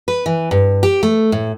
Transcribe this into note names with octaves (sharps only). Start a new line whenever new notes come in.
B4
E3
G2
G4
A3
A2